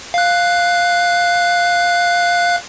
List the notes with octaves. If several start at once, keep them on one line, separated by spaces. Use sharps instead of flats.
F5 F#6